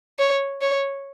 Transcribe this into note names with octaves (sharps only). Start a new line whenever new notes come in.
C#5
C#5